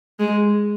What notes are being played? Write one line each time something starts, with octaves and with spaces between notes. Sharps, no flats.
G#3